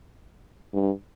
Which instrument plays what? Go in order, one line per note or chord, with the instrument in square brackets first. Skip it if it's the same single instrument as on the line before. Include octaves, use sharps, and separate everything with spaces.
[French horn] G2